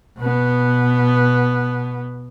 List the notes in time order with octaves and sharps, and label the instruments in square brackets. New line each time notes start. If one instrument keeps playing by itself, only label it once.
[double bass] B2 B3